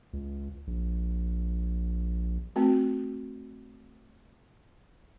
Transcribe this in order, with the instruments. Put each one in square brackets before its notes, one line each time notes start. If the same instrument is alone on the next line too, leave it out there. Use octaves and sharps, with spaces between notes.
[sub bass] C#2
A#1
[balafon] A3 C4 F#4